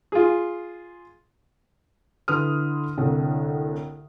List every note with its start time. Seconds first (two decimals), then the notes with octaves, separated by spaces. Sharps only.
0.12 F4 G#4
2.28 D3 E4 B4 C6 D#6 F6
2.98 C2 A2 D3